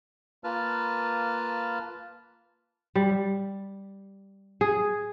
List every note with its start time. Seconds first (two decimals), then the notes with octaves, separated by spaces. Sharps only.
0.44 A#3 F4 B4 A5 F6
2.95 G3
4.61 G#4